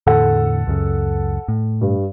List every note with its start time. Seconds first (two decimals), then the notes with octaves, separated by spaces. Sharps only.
0.07 E2 A2 D3 A4 F#5
0.67 C#2 F#2 C#3
1.48 A2
1.81 G2